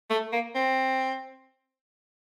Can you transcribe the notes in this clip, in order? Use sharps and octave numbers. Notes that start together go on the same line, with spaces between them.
A3
A#3
C4